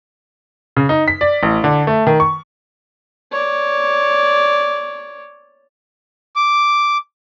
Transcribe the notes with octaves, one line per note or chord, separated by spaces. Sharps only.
C#3
D#4
B6
D5
A1
D3
A3
D#3
C#6
C#5 D5
D6